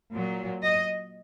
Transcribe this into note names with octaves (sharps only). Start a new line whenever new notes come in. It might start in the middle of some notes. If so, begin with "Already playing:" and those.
A#2 F#3
D#5